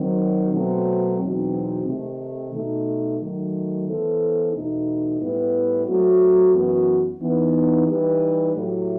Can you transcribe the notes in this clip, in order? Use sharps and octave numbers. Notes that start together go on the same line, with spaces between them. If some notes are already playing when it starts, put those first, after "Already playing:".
Already playing: D#3 F#3 C4
B2 F#3 A3 C4
E2 B2 F#3 C4 D#4
C3 D#3 A3
B2 A3 D#4
D#3 F#3 A3
E3 B3 E4 A4 C5
E2 B2 A3 D#4
A2 G3 B3 E4 B4
F#3 A3 C4 F#4
F#2 E3 B3 F#4
E3 B3 D#4
E3 G3 D#4 G4 B4
A2 F#3 A3 E4 G4